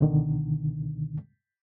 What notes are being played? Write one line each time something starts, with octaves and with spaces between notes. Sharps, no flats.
C#2 B2 D3 D#3